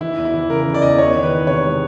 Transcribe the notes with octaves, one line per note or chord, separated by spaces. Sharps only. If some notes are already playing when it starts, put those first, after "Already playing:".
E3 E4
E2
E4
E3
C#3 A#4
E3
D5
E2 D#5
E2 C#5
D#3
B4
D#3
C3 C#5
G#3